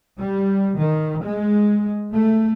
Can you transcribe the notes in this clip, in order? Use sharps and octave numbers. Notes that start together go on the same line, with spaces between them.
G3
D#3
G#3
A3